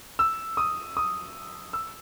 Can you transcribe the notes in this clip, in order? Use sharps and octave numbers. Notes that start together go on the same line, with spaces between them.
E6
D#6
D#6
E6